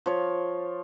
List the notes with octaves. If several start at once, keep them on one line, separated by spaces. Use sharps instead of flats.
F3 C#5